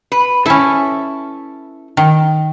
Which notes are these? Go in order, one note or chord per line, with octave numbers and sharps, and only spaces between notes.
B4
C#4 E4 A4 E5
D#3